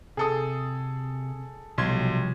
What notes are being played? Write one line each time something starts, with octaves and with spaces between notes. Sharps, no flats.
C3 G#4 A4 D#6
B1 C3 F3 G3 C6 G#6